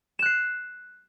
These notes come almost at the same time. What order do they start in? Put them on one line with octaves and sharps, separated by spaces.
E7 F#6 C7